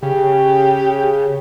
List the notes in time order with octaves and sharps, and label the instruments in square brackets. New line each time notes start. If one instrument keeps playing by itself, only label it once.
[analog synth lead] C#3 [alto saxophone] G4